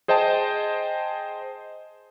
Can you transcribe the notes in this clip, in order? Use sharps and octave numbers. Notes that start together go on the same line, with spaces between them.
G#4 C5 D#5 G5 A5